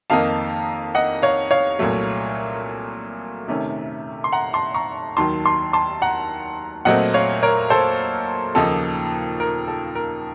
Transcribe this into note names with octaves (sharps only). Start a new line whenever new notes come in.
F2 D#3 A#3 D#4 F5 A5
D#5 F#5
C#5 F5
C#5 F5
C2 A#2 F#3 A3
C3 D#3 A3 C#4
C6
F#5 A#5
A5 C6
A#5 C#6
D#2 D#3 F#3 A5 C6
A5 C6
A5 C6
F#5 A#5
A#2 F#3 A3 C4 D#5 F#5
C#5 F5
A#4 C#5
A4 C5
D#2 C#3 F3 A#3 D#4 A4
A#4
A4
A#4